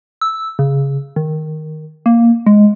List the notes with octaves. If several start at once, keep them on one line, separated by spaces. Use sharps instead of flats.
E6
C#3
D#3
A#3
G#3